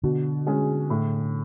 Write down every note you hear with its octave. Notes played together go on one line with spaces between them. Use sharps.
B2 D3
G#3 C#4 G#4
A2